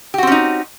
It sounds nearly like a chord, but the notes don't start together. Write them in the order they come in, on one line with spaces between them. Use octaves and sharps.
G4 F#4 C4 C#4 D#4